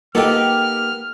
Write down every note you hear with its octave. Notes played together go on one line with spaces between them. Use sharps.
A#3 B3 D#4 G4 A4 D#5 G5 F6